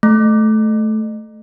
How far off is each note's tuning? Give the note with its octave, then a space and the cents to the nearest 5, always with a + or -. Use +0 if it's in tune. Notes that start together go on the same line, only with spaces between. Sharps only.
A3 -15